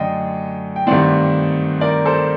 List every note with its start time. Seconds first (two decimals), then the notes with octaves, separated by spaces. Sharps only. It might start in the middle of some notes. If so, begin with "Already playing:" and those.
Already playing: F#2 D3 A3 D4 D#5 G5
0.76 G5
0.87 G2 D#3 A3 C4 D5 F#5
1.81 A#4 D5
2.05 A4 C5